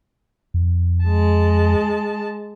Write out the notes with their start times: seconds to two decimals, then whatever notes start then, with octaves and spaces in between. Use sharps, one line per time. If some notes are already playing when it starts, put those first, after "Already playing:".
0.54 F2
1.05 G#3 A5